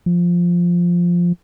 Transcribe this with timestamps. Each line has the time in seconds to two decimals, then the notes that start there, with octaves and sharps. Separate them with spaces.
0.06 F3